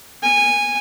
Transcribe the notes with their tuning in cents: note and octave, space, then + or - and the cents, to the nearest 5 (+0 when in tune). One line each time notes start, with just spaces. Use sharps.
G#5 -15